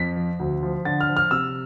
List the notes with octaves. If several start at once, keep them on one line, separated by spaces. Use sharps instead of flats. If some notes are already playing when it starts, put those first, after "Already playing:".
Already playing: F2 B6
F3
D2
F3
D3 A6
F6
F3
F6
C3 E6